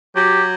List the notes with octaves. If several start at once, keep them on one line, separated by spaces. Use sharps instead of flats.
F#3 G4